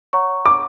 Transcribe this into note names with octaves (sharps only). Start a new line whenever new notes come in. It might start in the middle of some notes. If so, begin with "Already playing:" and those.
C#5 F#5 A#5 C#6
D6